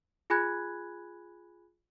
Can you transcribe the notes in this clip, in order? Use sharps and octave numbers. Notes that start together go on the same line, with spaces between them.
F4 G#4 G#5 B5 F#6 G#6